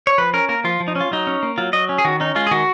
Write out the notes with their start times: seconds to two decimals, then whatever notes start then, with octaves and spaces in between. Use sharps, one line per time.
0.07 C#5
0.18 F3 B4
0.34 C#4 A#4
0.49 A#3 A#4
0.64 F3 F4
0.80 F3
0.88 D#4
0.95 C#4
1.01 F4
1.11 F#3 D#4
1.27 C#4
1.43 A#3
1.58 F#3 F4
1.73 F#3 D#5
1.89 C#4
1.98 G#4
2.05 D#3 F#4
2.20 C#4 D#4
2.35 G#3 F4
2.47 G#4
2.51 D#3 F#4